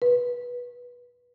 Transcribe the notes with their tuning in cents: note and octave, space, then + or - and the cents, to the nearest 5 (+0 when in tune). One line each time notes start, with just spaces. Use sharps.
B4 -20